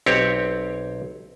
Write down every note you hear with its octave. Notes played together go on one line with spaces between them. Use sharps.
B1 C4 G4 C#5